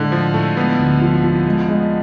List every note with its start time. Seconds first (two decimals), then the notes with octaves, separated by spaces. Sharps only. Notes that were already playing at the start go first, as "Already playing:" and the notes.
Already playing: A2 D3 G#3
0.12 A2 F3
0.34 A2 A3
0.56 G#3 B3
0.78 D2
1.01 F3
1.24 F3
1.46 G#3
1.68 G#3